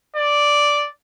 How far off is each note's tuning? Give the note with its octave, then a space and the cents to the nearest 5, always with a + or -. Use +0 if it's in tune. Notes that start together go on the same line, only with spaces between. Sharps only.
D5 -5